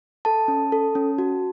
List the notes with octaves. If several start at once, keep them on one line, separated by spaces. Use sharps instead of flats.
A4 A5
C#4
A4
C#4
F#4